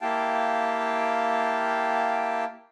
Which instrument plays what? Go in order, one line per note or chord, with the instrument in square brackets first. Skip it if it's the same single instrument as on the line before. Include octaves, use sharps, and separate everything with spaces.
[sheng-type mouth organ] A#3 E4 G4 F5 G5 A5